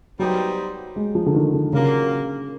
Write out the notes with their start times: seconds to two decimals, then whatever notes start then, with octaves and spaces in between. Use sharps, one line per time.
0.19 F#3 G3 B3 D#4 G4 C5
0.96 G#3
1.15 F3
1.26 D3
1.34 D#3
1.54 D3
1.73 A#2 C#3 F#3 A#3